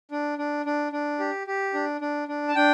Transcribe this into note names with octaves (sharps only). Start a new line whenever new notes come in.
D4
D4
D4
D4
G4
G4
D4
D4
D4
A5
D4 G5